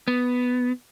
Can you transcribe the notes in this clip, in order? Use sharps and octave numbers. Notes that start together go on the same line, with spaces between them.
B3